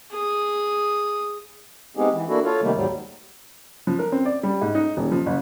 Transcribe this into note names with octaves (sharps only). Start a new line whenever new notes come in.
G#4 D#6
G#3 B3 C4 D#4 G4 G#4
E3
A#3 D4 E4 F#4 A4
F4 A4 C#5 F5
C3 D#3 G3 A3 A#3
D#2 G#2 F#3 G3
F3
A#4
C4
D5
G3
G#2
D#4
D#1
F3
F#1